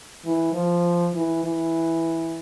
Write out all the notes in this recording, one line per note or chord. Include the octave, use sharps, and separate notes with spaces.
E3
F3
E3
E3